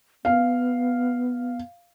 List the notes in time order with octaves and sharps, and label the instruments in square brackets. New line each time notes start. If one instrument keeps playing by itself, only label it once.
[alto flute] B3 [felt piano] F5